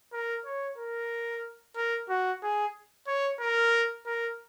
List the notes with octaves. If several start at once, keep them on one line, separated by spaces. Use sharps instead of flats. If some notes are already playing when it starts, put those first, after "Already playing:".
A#4
C#5
A#4
A#4
F#4
G#4
C#5
A#4
A#4